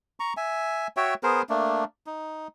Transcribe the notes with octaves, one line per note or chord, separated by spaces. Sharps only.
A#5 C#6
E5 G#5
F#4 C#5 E5 G5
B3 G#4 A#4 C5
A3 A#3 D4
D#4